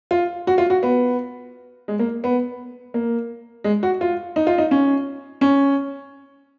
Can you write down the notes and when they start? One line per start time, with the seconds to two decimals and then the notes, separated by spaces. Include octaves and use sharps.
0.11 F4
0.47 F#4
0.58 F4
0.70 F#4
0.83 B3
1.88 G#3
1.99 A#3
2.24 B3
2.94 A#3
3.64 G#3
3.83 F#4
4.01 F4
4.36 D#4
4.47 F4
4.58 D#4
4.71 C#4
5.41 C#4